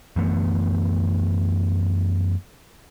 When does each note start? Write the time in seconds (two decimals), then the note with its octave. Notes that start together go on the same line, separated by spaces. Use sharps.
0.16 F#2 E3 A3 B3